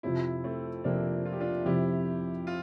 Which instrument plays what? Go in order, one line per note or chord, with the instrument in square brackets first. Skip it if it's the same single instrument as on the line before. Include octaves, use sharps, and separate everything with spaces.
[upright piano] F2 C3 F3 [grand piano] C4 E4
[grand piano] A3 C4
[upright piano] F2 C3 F3 [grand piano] A#3 D4
[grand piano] F4
G4
D4 F4
[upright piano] F2 C3 F3 [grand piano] E4 G4
[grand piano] F4